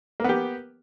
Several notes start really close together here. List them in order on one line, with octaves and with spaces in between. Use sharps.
A#3 B3 G4